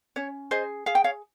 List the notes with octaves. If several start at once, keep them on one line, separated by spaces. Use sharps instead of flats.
C#4 C#5
G#4 C5 D#5
G#4 F5
G5
C#5 F5